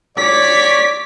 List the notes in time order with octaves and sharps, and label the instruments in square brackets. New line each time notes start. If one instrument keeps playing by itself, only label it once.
[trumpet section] C#5 D5 [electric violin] D6 B6